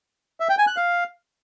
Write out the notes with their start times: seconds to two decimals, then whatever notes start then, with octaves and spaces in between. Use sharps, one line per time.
0.40 E5
0.49 G5
0.58 G#5
0.67 F#6
0.76 F5